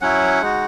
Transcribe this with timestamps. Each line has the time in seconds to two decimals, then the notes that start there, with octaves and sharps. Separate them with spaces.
0.01 F#3 C#4 E4 F#5
0.41 G#3 D#4 F#4